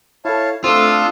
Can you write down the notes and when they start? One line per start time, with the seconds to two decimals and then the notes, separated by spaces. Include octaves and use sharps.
0.25 E4 A4 C#5 F5 A5
0.64 A3 C4 D4 F4 A4 D#6 E6